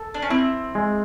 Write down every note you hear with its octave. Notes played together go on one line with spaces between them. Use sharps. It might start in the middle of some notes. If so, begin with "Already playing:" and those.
Already playing: A4
D4
C#4
C4 E4
G#3